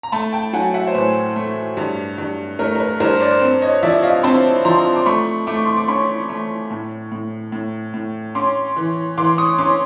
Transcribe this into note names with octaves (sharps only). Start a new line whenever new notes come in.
A#5
A3 A5 B5
G5 A5
F#3 F#5 G#5
E5 F#5
C5
A2 B4 C#5
A3
G2
G2
A3 A#4
A#4
B4
G2 A#4 C5
C5 D5
C4
C#5 D#5
F3 D5 E5
D#5 F5
C4 A5 B5
F3 A#5 C6
D6
A3 B5 C#6
A3 D6
C#6
C6 D6
D6
C#4 B5 C#6
A3
A2
A2
A2
A2
C#4 C6 D6
E3
E3 C6 D6
C#6 D#6
C#4 C6 D6